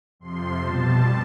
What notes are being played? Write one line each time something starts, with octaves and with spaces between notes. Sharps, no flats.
F2 C3 F3 C6
B2 G3 A5